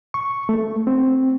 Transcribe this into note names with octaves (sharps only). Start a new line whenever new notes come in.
C#6
A3
C4